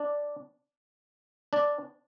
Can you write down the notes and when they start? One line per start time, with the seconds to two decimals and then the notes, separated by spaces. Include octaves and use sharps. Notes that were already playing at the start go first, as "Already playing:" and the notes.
Already playing: D4 D5
1.53 D4 D5